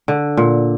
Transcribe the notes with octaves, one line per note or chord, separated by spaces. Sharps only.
D3
A#2